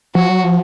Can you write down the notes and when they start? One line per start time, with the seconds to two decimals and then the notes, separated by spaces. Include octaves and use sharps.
0.15 F3 F#4
0.30 F#3
0.44 F3